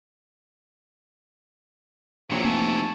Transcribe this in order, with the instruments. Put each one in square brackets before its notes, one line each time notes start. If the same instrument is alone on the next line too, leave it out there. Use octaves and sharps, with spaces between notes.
[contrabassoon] A#1 [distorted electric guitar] C3 E3 [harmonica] F#3 A#4 C#5
[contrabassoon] F1 [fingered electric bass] A#3 [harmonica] G#5 A5 C#6